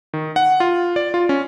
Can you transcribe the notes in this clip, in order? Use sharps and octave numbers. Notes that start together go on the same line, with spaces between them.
D#3
F#5
F4
D5
F4
C#4